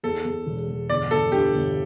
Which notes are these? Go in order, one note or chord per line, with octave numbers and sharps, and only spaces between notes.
E2 A4
E2
E1
E1
G1 D5
G1 A4
G2 G4
G1